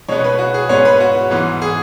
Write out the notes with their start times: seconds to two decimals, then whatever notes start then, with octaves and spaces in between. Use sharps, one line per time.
0.08 B2 G#3 B3 C#5
0.24 B4
0.39 F#4
0.54 G#4
0.69 G#2 G#3 B3 C#5
0.85 B4
1.00 F#4
1.30 G#2 E3 B3
1.62 G#4